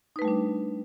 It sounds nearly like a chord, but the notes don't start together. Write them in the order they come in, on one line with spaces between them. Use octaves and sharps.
D#4 B4 A3 G3 D4